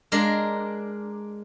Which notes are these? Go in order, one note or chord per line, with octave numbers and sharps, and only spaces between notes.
G#3 D4 A#4